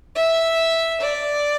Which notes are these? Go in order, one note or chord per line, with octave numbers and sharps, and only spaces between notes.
E5
D5